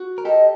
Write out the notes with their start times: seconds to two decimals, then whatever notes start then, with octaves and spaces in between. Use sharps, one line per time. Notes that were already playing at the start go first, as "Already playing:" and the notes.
Already playing: F#4
0.18 A#4
0.25 G4 A4 D#5